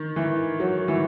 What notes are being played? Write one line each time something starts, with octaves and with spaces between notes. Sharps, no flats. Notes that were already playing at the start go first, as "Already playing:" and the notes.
Already playing: D#3
E3
F#3
E3